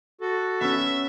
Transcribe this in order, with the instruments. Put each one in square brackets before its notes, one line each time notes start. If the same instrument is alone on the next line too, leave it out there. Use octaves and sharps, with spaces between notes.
[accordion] F#4 A4
[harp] B3 C#4 [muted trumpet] E5